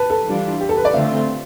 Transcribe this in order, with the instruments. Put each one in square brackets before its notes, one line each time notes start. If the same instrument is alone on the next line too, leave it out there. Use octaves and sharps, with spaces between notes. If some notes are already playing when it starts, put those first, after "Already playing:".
Already playing: [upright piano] B4 A5
A4
[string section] E3 G3 D4 F4
[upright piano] G4
A4
B4
D5
[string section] D3 A3 C4 F4 [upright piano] E5